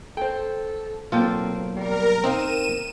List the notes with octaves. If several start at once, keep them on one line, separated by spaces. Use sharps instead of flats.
A4 C5 G5
B1 A#3 C4 F4 A4 G5
G3 A#4
C4 D#4 A#4 F5 D#7 E7